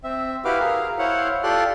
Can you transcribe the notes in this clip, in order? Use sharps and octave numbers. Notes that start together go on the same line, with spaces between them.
C4 E5
E4 F#4 G4 B4 F5 D6
G#4 A#4 F5
E4 C5 C#5 F5 F#5
F4 G4 A4 D5 C6 F#6